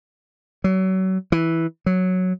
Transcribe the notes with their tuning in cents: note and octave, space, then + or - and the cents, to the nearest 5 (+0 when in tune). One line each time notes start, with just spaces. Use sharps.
F#3 +30
E3 -5
F#3 -5